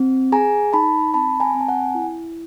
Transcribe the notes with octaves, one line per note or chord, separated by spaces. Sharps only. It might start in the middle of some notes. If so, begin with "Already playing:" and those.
Already playing: C4
G#4 G#5 A#5
D#4 A5 B5
C4 A5 B5
G#5 A#5
C4
A5
F#5 G#5
E4